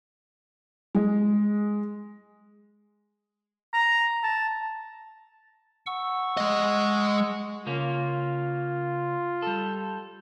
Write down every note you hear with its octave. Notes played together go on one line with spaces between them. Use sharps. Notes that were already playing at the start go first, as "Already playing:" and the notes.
G#3
A#5
A5
F#5 C#6 E6
G#3 D#5
C#3 A#3 C#4 F4
G3 A4